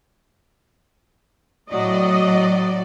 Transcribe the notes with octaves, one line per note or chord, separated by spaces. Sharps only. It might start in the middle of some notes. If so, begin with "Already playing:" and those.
A2 F#3 D5 D#5